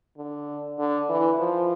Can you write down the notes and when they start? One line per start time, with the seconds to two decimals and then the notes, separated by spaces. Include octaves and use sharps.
0.17 D3
0.79 D3
1.09 E3
1.39 F3